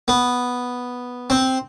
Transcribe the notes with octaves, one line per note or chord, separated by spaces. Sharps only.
B3
C4